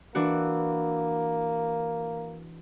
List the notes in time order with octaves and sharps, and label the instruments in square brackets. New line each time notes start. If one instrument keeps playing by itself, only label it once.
[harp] E3 D4 F#4 [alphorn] A#3